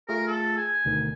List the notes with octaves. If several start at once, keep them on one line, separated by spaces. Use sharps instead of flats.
A3 F4 G#4 A#4
A4
G#5
D2 B2 D#3